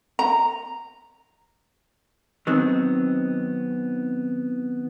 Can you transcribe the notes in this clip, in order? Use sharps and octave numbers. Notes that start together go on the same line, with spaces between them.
A#5
D#3 F#3 B3 C4